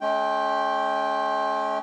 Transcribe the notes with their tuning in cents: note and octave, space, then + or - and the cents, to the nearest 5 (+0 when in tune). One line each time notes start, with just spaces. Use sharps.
G#3 +45 C#4 +10 G5 +0